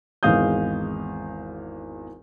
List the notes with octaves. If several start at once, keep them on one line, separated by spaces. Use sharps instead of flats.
G#1 E2 G#3 F5 D#6 G6